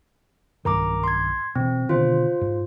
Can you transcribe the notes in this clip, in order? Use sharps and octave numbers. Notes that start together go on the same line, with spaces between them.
B1 G2 D#3 A#4 A#5 D6
C6 G#6
B2 E3 C4
B2 D3 D#3 F4 C5
G#2